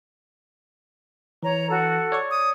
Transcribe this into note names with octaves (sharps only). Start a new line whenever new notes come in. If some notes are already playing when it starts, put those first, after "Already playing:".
E3 C#5 A#5
F#4 A4
C#5 D5 C#6
D#6